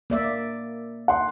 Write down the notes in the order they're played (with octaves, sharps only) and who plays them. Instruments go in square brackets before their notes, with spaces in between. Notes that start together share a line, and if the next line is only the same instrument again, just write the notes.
[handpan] A#3 D5 E5
[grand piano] F#5 C6